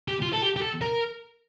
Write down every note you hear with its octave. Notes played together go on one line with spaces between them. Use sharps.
G4
F4
A4
G4
G4
A4
A#4